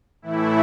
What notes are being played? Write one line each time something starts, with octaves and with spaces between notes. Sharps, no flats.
A2 E3 A3 E4